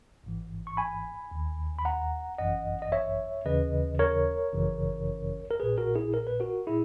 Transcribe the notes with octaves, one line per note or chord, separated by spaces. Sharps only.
G#1 G#2 E3
C#6
G#5 B5
D#2 D#3
B5
F#5 A#5
G#1 F#2 E3 D#5 F#5
D#5
C#5 E5
D#2 C#3 E3 B4 D#5
A#4 C#5
G#1 F#2 C#3 E3
A#4
A#1 A#2 G#4 B4
F#4 A#4
E4 G#4
A#4
B4
F#4 A#4
A#2 E4 G#4